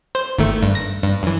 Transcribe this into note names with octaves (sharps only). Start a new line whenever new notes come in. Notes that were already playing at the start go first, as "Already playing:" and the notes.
C5
G1 D#3 A3
G2
A#6
G2
F#2 E3